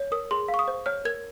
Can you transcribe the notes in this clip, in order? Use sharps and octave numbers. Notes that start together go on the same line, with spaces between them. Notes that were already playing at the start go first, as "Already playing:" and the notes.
Already playing: C#5
A#4 D#6
G#4 C6
F5
C#6
D#6
C5
C#5 F6
A#4 G#6